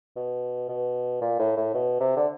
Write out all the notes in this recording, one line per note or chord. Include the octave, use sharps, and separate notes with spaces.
B2
B2
A#2
A2
A2
B2
C3
D3